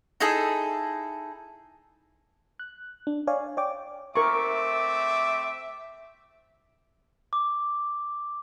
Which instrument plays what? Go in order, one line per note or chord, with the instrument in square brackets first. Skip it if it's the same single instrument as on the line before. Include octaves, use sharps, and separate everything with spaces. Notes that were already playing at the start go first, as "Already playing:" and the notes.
[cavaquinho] D#4 E4 G#4 A4
[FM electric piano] F#6
D4
C#5 D5 F5 G#5
C#5 D5 G5 D6
[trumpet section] A3 C4 D6 [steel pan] A#4 C#6 [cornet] E5
[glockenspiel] D6